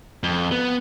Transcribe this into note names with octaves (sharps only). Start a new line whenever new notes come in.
F2
B3